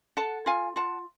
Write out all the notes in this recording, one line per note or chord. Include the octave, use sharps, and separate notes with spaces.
A4 F#5 A5
F4 F5 G#5
F4 F#5 A5